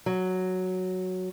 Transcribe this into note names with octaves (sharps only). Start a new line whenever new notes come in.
F#3